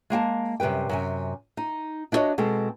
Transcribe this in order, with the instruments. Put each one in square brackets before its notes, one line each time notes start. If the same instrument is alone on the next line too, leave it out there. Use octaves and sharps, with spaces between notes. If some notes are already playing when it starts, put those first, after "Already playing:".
[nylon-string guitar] G#3 A#3 G5 A5
F#2 C3 G3 B4 G5
F#2 C3 G#5
D#4
D4 E4 F#4 A#4 C#5 D#5
B2 G#3 C4 A4